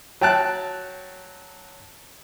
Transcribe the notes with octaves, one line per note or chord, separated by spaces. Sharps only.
F#3 G5 A5 F#6